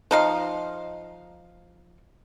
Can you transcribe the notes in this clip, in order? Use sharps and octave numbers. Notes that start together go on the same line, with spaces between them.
F3 D#4 F5